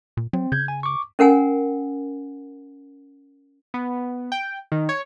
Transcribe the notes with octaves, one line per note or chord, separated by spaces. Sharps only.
A#2
F#3 C4
C#3 G6 G#6
G#5
C#6 D6
C#4 A#4 F#5 G#5
B3
G5
D#3
C#5